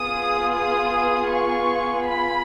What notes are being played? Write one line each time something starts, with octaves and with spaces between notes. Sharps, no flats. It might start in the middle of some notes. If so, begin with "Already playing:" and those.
Already playing: B3 F4 G#4 D#6
D#6
C#6
B5